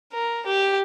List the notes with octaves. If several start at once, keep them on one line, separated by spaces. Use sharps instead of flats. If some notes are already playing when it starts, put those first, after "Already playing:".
A#4
G4